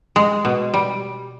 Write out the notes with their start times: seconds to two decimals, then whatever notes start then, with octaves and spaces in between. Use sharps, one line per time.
0.16 G#3
0.45 B2
0.74 G3